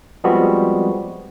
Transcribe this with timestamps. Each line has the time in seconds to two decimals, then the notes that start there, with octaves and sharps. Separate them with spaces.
0.24 F3 G3 G#3 B3 C4 F#4